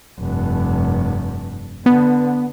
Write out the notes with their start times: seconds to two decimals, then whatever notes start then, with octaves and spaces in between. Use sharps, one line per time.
0.19 F1 G2
1.86 D3 B3